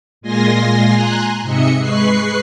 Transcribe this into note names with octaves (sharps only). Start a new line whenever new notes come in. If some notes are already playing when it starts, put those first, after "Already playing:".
A#2 G#3 F4 G#5 C6 A#6
G#5 A#5 C6 F#6
G#2 C3 D#5 E5 C#7
G#3 B4 C#6 F#6 C7